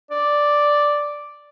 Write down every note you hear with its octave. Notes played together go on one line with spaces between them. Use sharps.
D5